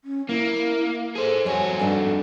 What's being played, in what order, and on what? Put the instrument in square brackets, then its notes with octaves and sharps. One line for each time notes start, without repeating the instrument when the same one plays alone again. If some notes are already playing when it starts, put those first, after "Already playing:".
[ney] C#4
[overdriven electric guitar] A#3 [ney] E4
[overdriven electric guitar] G#4 C5 [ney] A4
[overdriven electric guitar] F2 F#4 [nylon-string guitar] C#5 [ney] G#5
[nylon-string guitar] G2 D4 D#4 [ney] A4